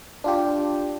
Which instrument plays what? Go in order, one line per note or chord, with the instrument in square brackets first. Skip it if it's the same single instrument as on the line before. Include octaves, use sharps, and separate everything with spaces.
[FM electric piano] D4 F4 G4